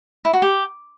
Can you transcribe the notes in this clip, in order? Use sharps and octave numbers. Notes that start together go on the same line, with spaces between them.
E4
F#4
G4